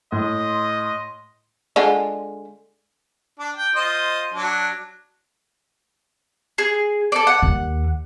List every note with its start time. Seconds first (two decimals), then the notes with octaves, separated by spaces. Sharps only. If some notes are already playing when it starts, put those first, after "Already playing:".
0.12 A2 D#5 C6
1.76 D3 G#3 F4
3.39 D4
3.57 G5
3.76 F4 C5 D#5
4.34 F#3 D4
6.58 G#4
7.12 A4 D5
7.27 F#5
7.42 D#2